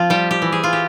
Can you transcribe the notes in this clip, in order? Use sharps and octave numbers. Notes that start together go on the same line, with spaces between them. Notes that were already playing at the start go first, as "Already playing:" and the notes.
Already playing: F3 C4 F4
G3 G4
G4
E3
G#4
F4
G4